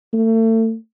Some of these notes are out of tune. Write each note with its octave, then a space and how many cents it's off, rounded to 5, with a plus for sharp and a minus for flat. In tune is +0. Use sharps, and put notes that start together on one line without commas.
A3 +35